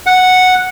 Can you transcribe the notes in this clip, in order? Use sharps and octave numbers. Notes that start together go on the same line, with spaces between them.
F#5